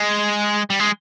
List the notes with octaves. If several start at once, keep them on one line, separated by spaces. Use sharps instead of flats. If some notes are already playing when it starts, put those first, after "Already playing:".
Already playing: G#3
G3
G#3